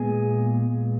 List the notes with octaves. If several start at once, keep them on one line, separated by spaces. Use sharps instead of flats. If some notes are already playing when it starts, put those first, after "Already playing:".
Already playing: A#2 G#3 B3 G#4 G#5